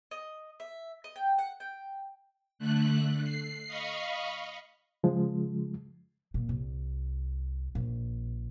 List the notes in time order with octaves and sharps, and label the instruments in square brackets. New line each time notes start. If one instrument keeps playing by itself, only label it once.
[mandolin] D#5
E5
D#5
G5
F#5
G5
[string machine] D3 A3 F#6
C7
D#5 F5 B5 C#6
[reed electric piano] C#3 F3 G#3
[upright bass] A#2
C2
A#1